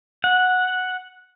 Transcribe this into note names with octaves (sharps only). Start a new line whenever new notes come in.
F#5